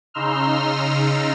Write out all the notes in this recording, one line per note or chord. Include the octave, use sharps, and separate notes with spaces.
C#3 D#4 A#5 C6 E6 F6